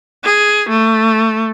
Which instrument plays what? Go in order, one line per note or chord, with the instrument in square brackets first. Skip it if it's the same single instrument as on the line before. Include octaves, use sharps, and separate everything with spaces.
[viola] G#4
A3